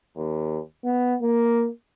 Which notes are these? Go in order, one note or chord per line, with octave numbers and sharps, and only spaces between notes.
D#2
B3
A#3